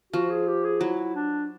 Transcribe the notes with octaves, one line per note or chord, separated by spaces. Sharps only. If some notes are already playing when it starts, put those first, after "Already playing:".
F3 F#4
G#4
G4
G#4
F#3 E4
D4